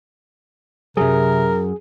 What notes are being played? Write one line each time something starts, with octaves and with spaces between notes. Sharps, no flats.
F#2 C3 F#3 G#4 A#4